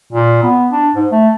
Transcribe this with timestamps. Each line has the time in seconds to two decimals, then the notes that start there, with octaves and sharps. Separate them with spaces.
0.13 A#2
0.43 B3
0.71 D4
0.95 G#2
1.11 A3